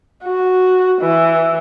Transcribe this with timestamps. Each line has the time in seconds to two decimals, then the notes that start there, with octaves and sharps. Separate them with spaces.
0.24 F#4
1.01 E3